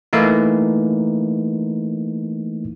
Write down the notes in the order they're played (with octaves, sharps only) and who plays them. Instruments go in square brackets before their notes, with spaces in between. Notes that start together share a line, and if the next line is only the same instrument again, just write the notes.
[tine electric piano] E3 A3 A#3 D#4